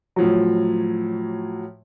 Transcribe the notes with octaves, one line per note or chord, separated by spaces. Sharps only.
A2 F3 F#3